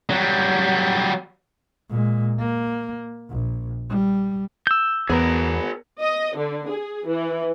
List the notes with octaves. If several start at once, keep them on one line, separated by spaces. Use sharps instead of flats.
F#3 G3
A#2 G#3
A#3
A#1
G3
E6 G6
E2 B3 G#4 A#4
D#5
D3
G#4
E3